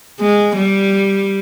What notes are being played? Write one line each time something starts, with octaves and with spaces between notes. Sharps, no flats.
G#3
G3